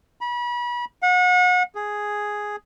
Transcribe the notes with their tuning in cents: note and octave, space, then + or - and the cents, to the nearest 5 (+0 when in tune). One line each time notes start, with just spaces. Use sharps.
B5 -35
F#5 -35
G#4 +0